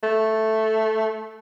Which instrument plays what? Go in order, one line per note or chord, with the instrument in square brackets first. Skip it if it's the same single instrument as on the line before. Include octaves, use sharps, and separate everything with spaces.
[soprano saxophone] A3